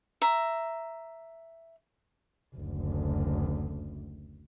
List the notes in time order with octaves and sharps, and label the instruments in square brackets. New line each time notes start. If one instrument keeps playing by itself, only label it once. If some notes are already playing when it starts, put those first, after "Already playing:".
[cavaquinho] E5 A#5
[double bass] F#1 D2